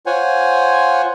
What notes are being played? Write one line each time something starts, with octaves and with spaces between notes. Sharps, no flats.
F4 C5 C#5 F#5 G#5